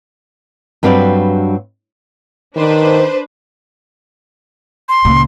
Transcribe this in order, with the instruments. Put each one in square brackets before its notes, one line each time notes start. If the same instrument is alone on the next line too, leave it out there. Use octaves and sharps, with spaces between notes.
[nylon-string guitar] G2 F#3 C4 B4 D5 F5
[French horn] D#3 [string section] D4 B4 C5
[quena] C6
[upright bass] C#2 A#2